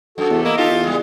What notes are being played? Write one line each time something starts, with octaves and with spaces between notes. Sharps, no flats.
F#2 F#4 A4
E2 C3 A3
A#3 E4 D#5
D#3 F4 G4 A4
E2
C#3 G3 G#3